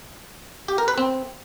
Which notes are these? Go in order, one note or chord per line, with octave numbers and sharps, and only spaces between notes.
G4
A#4
B4
C4